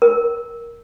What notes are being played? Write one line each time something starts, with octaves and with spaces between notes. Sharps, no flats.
A#4